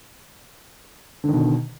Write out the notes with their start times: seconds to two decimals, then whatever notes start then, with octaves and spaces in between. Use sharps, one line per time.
1.24 D3
1.28 D#3
1.33 B2